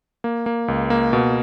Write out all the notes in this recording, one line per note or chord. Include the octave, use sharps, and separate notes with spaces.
A#3
A#3
C#2
A#3
B2